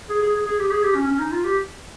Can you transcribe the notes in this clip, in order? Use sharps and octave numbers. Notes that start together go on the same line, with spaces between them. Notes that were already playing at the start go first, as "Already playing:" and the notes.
G#4
G#4
G#4
G#4
G4
G#4
G4
C#4
C#4
D#4
F4
G4